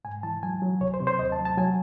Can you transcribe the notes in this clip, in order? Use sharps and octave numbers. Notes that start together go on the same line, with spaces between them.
G#2 G#5
E3 A5
F#3 G#5
F#3
C2 C#5
C5
C3
C5
D#2 D#5
A5
F#3
A5
F#3 G#5